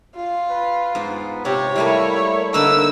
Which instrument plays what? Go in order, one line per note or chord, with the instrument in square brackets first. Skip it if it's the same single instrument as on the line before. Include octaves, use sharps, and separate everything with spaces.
[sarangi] F4
[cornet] B4
[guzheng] G#2 [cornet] B3
[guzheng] C3 [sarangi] G4 [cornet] C#5
[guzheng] G3 A3 A#3 [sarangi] E4
[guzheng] D3 A#3 B3 [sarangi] D#4 [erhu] E6